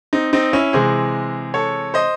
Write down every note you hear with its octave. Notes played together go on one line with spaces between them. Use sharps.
C4 D#4
C4 D#4
C#4 E4
C3 E3 G#3 G#4 C5
A4 C#5
C5 D#5